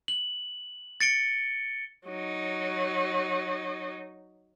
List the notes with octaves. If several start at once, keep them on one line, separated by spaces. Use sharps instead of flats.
F#7
A6 C#7 D7 G7
F#3 D#4